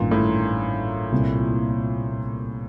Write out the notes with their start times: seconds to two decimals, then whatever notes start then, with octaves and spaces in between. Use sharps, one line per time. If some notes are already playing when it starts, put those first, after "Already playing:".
Already playing: A1 G2 A#2 D#3
0.11 A2
1.12 C2 A#2 G3 C4 E4